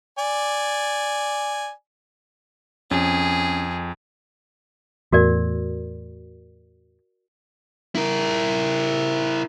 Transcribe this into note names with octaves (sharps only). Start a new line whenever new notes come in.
D5 G#5
F2 C#4 G#4
E2 A2 F#4 A#4 D5
E4 A#4